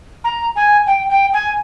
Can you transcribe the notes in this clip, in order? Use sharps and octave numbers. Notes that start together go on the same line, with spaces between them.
A#5
G#5
G5
G5
G#5